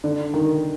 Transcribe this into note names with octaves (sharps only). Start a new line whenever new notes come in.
D3
D#3